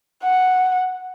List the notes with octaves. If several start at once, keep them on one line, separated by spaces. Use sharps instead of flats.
F#5